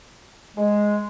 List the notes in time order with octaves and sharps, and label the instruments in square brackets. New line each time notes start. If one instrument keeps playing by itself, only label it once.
[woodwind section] G#3